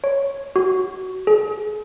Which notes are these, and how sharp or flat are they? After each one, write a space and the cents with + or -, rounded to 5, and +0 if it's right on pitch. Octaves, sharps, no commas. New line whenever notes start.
C#5 +0
F#4 +10
G#4 +35